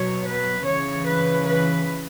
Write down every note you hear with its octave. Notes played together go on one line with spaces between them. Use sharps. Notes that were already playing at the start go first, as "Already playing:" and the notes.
Already playing: B2 F#3 C#5
B4
C#3 E3 C#5
B4
B4